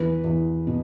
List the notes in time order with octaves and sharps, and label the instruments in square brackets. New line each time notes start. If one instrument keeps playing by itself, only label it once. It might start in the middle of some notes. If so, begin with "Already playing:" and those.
Already playing: [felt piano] E2 B4
E2
B2